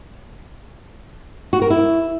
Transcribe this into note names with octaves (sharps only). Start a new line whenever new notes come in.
F#4
A#4
E4